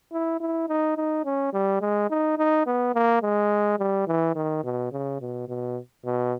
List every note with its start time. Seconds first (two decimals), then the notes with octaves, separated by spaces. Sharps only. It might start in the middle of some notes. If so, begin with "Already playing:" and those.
0.12 E4
0.40 E4
0.68 D#4
0.97 D#4
1.25 C#4
1.53 G3
1.81 G#3
2.10 D#4
2.38 D#4
2.67 B3
2.95 A#3
3.22 G#3
3.79 G3
4.07 E3
4.36 D#3
4.64 B2
4.92 C#3
5.21 B2
5.48 B2
6.05 B2